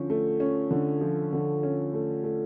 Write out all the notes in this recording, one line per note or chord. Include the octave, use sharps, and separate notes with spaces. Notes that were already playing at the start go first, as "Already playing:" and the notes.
Already playing: D3 F3 C#4
A3
C#4
D3
F3
D3
C#4
A3
A3